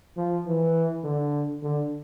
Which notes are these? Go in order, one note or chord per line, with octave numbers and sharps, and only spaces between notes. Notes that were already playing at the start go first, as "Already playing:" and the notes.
F3
E3
D3
D3